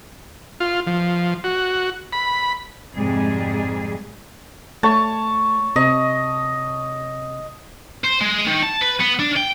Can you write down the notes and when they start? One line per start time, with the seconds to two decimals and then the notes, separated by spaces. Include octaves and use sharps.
0.60 F4
0.87 F3
1.44 F#4
2.13 B5
2.93 F2 G#2 C3 G3 G#3 G#4
4.83 A3 C#5 A5
5.76 C3 D#5
8.04 C5
8.21 G#3
8.47 D#3
8.63 A5
8.82 B4
9.01 B3
9.20 D4
9.37 G5